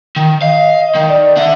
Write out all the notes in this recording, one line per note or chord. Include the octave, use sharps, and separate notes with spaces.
D#3
D#5 F5
D#3
D5
D4 E5 F#5